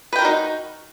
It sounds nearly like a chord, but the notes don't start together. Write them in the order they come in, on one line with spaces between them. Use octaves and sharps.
B4 G5 A#4 F#4 D#4